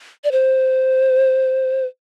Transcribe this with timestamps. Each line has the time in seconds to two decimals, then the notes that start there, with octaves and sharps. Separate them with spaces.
0.24 D5
0.32 C5